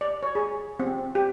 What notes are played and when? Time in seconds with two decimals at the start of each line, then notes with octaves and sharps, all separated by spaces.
0.01 D5
0.23 C#5
0.35 G#4
0.80 C4
1.15 G4